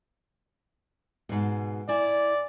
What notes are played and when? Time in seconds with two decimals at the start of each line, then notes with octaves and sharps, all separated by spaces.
1.29 G#2 B2
1.88 E4 D5 G#5